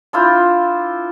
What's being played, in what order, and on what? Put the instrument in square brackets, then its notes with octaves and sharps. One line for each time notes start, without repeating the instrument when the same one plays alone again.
[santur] D4 E4 F4 C5